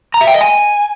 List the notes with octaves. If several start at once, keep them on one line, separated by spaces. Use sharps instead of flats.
A#5
E5
G5
D#5
G#5